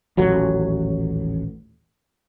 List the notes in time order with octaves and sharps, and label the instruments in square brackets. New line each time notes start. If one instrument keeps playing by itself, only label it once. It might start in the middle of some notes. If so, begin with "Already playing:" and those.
[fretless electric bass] D#1 A1 F#3